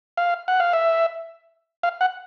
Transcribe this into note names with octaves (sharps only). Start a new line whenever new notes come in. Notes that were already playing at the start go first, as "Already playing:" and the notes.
F5
F#5
F5
E5
F5
F#5